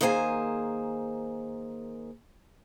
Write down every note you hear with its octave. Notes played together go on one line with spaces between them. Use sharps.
D#3 A#3 G#4 C5 F#5 G#5